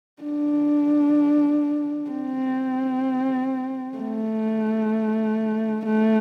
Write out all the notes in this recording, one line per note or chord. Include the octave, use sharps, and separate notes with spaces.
D4
C4
A3
A3